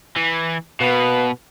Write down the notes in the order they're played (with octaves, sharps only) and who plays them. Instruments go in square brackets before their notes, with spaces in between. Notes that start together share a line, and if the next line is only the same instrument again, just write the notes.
[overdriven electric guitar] E3
[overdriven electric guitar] B2 [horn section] A#3 B3 B4